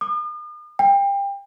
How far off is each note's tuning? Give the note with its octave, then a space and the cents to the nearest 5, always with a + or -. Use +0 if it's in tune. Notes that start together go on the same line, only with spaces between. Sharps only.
D#6 -45
G5 +25